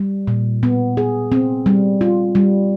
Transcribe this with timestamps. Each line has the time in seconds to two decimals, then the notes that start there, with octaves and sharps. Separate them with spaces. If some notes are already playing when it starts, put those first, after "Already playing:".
Already playing: G3
0.27 A#2
0.63 B3
0.97 G#4
1.32 C4
1.66 G3
2.01 F4
2.35 G3